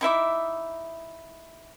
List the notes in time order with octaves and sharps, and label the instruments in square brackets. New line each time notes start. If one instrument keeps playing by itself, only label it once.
[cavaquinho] D#4 E4 E5 D6